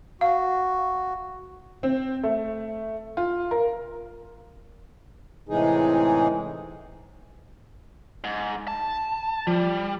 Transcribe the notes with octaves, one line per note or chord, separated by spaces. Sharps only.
F#4 F5
C4
A3
F4
A#4
A2 C3 E3 G#3 D#4 G#4
G#2
A5
F3 G3